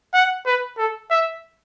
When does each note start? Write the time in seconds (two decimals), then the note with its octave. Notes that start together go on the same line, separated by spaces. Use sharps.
0.14 F#5
0.46 B4
0.78 A4
1.10 E5